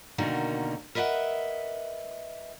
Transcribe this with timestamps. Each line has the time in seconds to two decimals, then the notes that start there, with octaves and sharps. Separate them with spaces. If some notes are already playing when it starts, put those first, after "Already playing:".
0.18 B2 D3 D#3 A#3 F#4 A#4
0.95 A#4 B4 D#5 E5 F#5